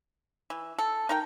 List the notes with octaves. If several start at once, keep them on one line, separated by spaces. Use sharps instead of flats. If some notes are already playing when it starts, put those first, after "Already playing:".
E3
A4
D#4 A#4 G5